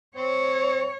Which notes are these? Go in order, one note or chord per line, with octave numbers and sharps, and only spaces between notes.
C4 C#5